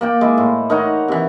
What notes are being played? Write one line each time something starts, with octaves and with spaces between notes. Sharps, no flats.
A#3 D5 G5
G#3 E4
A2
D#4 A#4 C#5 F#5
C3 E3